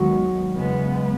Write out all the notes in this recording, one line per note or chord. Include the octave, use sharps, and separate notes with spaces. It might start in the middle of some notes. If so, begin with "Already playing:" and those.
Already playing: D#2 D#3 F#3 G#3 B3
E2 C#3 G#3 B3